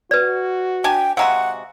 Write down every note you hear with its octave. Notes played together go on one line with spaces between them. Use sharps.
F#4 B4 D5
D4 G5 G#5
C3 G#3 F#4 F5 F#5 A#5